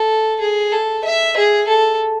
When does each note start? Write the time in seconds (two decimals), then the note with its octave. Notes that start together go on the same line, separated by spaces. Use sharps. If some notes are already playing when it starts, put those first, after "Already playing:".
Already playing: A4
0.40 G#4
0.72 A4
1.04 E5
1.37 G#4
1.68 A4